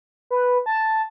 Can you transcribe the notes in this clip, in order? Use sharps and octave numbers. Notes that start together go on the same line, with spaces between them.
B4
A5